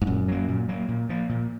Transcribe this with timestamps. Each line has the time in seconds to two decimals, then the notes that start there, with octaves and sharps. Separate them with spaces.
0.02 G#2
0.07 F#2 A#2
0.28 F#3 A#3
0.48 A#2
0.68 F#3 A#3
0.88 A#2
1.09 F3 A#3
1.29 A#2